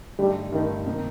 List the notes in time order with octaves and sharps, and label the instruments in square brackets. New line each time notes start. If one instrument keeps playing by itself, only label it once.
[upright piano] G2 D3 A3 D#4 [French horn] G3
[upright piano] G2 D3 A3 D#4 [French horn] D#3
[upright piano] C3 D#3 A#3 D#4